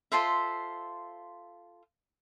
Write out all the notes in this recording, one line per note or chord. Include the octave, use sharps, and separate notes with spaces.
F4 A4 C5 E5